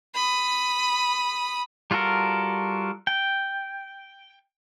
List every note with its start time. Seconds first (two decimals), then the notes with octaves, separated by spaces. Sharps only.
0.15 B5 D#6
1.91 G3 F4 F#4 A4 A#4
3.07 G5